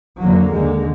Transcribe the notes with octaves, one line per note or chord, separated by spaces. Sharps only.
F2 D3 F#3 A#3
D#2 D3 G#3